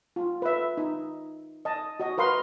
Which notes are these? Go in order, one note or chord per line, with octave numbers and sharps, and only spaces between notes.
F4
B4 E5
D#4
D#5 A5
F#4 D#5
A#4 B4 F5 C6